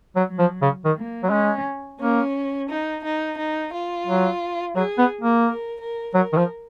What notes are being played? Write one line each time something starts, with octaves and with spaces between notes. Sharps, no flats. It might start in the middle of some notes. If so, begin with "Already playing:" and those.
F#3
F#3
F3
C#3
D#3
A#3
F#3
G#3 C#4
A#3 C#4
D#4
D#4
D#4
F4
F#3
F#3 G#4
B3
A#3
A#4
A#4
F#3 A#4
D#3
F3